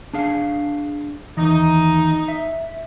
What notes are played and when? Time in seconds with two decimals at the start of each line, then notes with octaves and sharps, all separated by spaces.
0.13 D4 G#4 F5
1.37 D#2 E3 D#4
2.28 E5